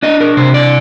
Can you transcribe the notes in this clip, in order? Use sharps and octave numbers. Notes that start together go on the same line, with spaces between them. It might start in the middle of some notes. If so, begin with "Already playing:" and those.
D4 D#5
A#4
C3 C5
D5